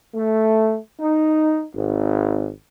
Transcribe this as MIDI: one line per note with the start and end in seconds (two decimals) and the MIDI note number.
0.15 0.77 57
1.00 1.64 63
1.74 2.50 32